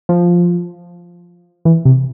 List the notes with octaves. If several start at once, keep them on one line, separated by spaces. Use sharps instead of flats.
F3
E3
C3